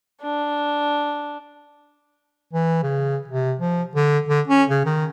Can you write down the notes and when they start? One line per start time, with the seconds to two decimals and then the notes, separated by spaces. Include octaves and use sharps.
0.21 D4
2.53 E3
2.83 C#3
3.28 C3
3.59 F3
3.95 D3
4.29 D3
4.48 C#4
4.70 C#3
4.86 D#3